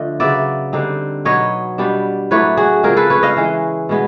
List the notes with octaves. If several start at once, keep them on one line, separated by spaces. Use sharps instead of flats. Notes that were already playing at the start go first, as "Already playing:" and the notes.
Already playing: D3 F3 A3 D#5
C#3 F#3 B3 D5 E5
D3 G3 C4 D#4
B2 F#3 B3 C#5 D#5
B2 G3 B3 D4
A2 F#3 A3 D4 B4 C#5
F#4 G#4
C#3 F3 G#3 C4 G#4 A#4
A4 B4
B4 C#5
D#5 F5
E3 G#3 C#4
B2 G#3 B3